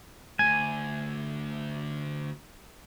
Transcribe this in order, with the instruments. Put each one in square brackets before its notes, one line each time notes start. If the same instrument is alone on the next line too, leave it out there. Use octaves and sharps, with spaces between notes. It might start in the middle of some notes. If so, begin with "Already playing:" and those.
[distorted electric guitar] D2 G#2 [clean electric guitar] G#5